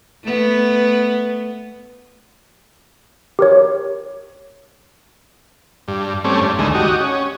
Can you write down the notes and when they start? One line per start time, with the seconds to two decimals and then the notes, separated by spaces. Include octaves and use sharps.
0.23 A3 B3
3.39 G4 A#4 C#5
5.88 G2
6.24 G3 A3 C4 C#4
6.41 G2
6.59 D2 D#3 G#3 A3
6.75 F#4 G4 D#5
7.00 C#4